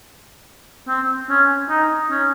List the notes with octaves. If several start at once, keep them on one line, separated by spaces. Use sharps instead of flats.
C4
C#4
D#4
C#4